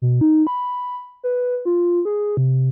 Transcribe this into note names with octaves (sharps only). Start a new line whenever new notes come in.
B2
D#4
B5
B4
F4
G#4
C3